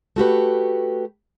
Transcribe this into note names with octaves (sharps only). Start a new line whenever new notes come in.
A3 F#4 G4 B4